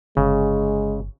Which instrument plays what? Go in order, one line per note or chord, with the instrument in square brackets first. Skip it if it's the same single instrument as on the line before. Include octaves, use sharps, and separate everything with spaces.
[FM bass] G1 [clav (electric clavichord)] C#3 [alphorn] G#3